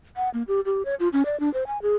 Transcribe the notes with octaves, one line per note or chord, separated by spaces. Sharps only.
F#5
A#3
G4
G4
C#5
F4
C#4
D5
D4
C5
G#5
G#4